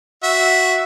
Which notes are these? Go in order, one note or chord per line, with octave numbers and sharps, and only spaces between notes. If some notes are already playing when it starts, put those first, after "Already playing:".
F#4 E5